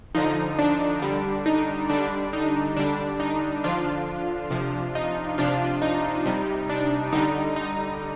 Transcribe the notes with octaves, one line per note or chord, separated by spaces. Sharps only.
D3 F3 D#4
D4
D3 G3
D#4
D3 G3 D4
D#4
D3 G3 D4
D#4
D3 F3 D4 F4
C3 F3
D#4
C3 F3 D4 F4
D#4
C3 G3
D4
D3 G3 D#4
D#4